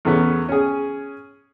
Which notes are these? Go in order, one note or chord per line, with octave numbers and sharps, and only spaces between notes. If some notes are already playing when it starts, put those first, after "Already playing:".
E2 C#3 A3 B3 C#4
C#4 G#4